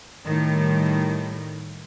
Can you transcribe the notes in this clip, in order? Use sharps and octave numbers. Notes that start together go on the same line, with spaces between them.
A2 D#3 G3